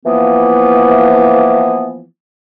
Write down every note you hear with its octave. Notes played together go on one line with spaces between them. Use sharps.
E3 F3 A#3 B3